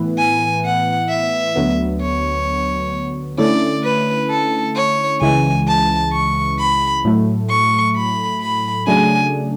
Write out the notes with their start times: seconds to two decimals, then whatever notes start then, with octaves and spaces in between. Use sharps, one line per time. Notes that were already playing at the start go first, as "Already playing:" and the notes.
Already playing: A2 E3 B3 E4 B4
0.18 G#5
0.65 F#5
1.09 E5
1.56 D2 D3 F#3 B3
2.02 C#5
3.38 D3 A3 C#4 E4 D5
3.84 B4
4.30 A4
4.76 C#5
5.21 C#2 C#3 E3 G#3 G#5
5.68 A5
6.12 C#6
6.59 B5
7.05 A2 F#3 A3
7.50 C#6
7.96 B5
8.41 B5
8.87 C#3 F#3 A3 D4 G#4 G#5